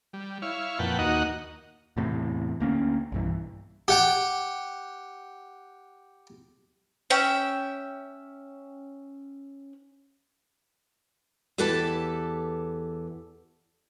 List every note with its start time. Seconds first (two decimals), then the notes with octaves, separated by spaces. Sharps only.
0.13 G3
0.42 E4 C#5 F5
0.79 F2 A#2 B4 F#5 G5 A5
0.99 D#2 A#3 D#4 F#4 D#5 F#5
1.97 E2 A2 C3
2.60 D2 A#3 C#4
3.12 B1 G2 E3
3.88 G4 F#5 G5
7.10 C#4 E5 G5
11.58 E2 G4 A4 B4 A5